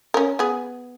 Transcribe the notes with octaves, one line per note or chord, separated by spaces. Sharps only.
C#4 A#4
B3 G#4